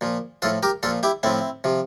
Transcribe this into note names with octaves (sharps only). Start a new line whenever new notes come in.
A#2 F3
A2 F3 F4 A4
G4 A#4
A#2 F3 F4 A4
E4 G4
A2 F3 C4 E4
C3 F3